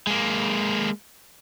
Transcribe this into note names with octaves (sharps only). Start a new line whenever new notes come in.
G#3 A#3